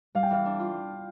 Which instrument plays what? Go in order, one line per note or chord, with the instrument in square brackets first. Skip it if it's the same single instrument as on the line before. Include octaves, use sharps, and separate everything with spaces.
[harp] G3 [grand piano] F5
[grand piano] G5
[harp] E3 [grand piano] F5
[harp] D4
F4